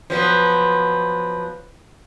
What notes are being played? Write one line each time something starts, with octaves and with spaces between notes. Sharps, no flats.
F3 F#3 B3